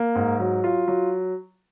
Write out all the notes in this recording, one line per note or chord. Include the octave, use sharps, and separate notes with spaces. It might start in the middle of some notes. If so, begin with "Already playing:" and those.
Already playing: A#3
G#2
F#3
F4
F#3